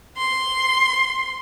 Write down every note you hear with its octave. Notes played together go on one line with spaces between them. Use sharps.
C6